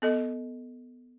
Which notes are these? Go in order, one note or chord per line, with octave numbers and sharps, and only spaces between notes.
B3 A4 D#5